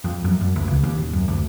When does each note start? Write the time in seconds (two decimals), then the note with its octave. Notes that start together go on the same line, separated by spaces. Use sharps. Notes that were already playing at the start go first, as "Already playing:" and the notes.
0.04 F2
0.24 F#2
0.41 F#2
0.56 D2
0.68 C#2
0.83 D#2
0.97 D#1
1.13 F#2
1.28 D2